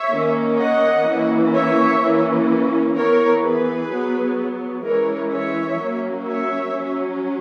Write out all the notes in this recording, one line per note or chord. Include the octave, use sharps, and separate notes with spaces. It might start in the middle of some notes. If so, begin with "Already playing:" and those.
Already playing: C#5 E5
D#3 A#3 C#4
D#5 F#5
E3 A#3 C#4
C#5 E5
E3 A#3 C#4
E3 B3 A#4 C#5
G#4 B4
F#3 B3
E3 G#3 C#4 A#4 C#5
C#5 E5
F#3 A#3 C#4
C#5 E5
F#3 C#4